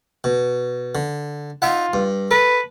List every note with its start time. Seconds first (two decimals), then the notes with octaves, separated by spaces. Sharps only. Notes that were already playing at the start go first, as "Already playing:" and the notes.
0.24 B2
0.95 D3
1.62 D#4 F4 E5 F#5
1.93 G2
2.31 A4 B4